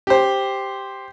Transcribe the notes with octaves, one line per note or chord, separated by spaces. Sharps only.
G4 C5